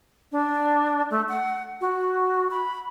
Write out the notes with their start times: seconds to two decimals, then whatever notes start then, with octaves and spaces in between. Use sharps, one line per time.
0.32 D4
1.10 A3
1.29 F#5
1.81 F#4
2.51 B5